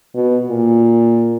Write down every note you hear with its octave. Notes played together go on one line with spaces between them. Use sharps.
B2
A#2